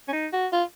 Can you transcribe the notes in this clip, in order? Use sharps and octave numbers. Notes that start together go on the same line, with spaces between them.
C#4
D#4
F#4
F4